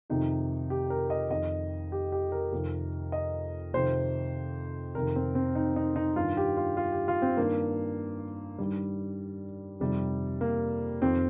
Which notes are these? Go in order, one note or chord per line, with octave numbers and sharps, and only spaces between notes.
F2 C3 D#3 D#4
G4
A#4
D#5
F2 D#3 D#5
G4
G4
A#4
F2 C3 D#3
D#5
F2 C3 D#3 C5
F2 C3 D#3 A#4
C4
C4
D#4
D#4
D#4
G2 D#3 F4
G4
F4
F4
G4
F4
C4
G2 D#3 A#3
G2 D#3 G3
F2 C3 D#3 G3
A#3
F2 D#3 C4